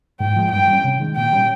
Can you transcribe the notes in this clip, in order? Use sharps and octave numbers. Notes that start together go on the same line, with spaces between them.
G#2 G5
F3 G#3
G2 G5
G3 C#4
C3
D#3 G#3
A#2 G5
G3 C#4